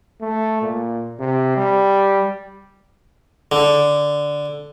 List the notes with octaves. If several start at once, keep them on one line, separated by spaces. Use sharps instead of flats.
A3
A#2
C3
G3
D3